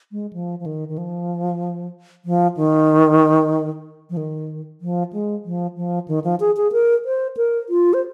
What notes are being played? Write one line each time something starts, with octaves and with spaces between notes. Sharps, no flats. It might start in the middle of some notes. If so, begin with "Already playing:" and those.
G#3
F3
F3
D#3
D#3
F3
F3
D#3
F3
D#3
F3
G#3
F3
F3
D#3
F3
G#4
G#4
A#4
C5
A#4
F4
C5